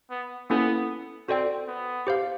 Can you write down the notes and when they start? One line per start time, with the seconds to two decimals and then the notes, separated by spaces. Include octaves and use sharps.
0.10 B3
0.50 A#3 B3 C#4 E4 A4
1.28 C4 F#4 A4 D5 G5
1.68 B3
2.07 G4 C5 F5